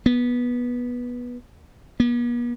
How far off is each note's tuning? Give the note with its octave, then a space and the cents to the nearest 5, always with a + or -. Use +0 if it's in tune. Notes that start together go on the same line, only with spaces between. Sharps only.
B3 -15
B3 -45